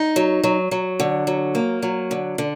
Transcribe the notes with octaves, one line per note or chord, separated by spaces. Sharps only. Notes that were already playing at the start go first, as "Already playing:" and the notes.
Already playing: D#4
F#3
F#3
F#3
D3
F#3
A#3
F#3
D3
D3